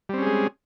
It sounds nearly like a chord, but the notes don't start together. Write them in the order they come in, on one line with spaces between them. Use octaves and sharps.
G3 C4 C#4 G#4 G#3